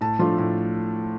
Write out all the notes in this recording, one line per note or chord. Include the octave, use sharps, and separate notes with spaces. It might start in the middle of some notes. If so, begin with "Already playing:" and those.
A2 A5
F3 A3 D4 F4
A2